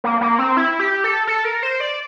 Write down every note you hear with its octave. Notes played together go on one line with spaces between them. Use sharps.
A#3
A#3
C4
E4
G4
A4
A4
A#4
C5
D5